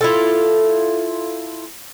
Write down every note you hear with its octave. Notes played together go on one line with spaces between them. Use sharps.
E4 F4 A4